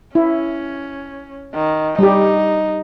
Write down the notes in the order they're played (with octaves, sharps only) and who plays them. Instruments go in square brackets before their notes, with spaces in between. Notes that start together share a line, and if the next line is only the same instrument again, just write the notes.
[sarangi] C#4 [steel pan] E4
[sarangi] D#3
[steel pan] G3 G4 [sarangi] D#4